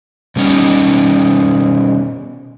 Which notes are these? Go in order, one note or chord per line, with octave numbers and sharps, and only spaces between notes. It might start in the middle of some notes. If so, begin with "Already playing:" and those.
B2 G3 C#4 D#4